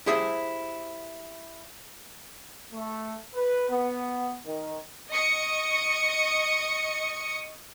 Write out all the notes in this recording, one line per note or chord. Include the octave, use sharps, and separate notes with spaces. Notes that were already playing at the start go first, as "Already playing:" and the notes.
E4 G4 G#4 C5 E5
A3
B4
B3
D#3
D#5 C#6 D#6 C#7